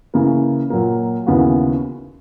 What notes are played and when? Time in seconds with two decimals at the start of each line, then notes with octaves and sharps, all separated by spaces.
0.14 C#3 E3 A#3
0.70 A#2 F#3 A#3
1.27 D#2 C#3 E3 B3 F#4